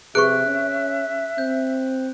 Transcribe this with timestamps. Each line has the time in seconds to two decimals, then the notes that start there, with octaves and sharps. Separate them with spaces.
0.15 C3 G#4 B4 E5 C#6 F#6 D7
0.46 C#4
1.38 C4 G6